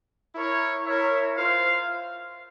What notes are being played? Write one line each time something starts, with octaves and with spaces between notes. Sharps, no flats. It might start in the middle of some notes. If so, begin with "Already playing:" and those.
E4 A#4 C#5
E4 A#4 C#5 E5
F4 C5 F5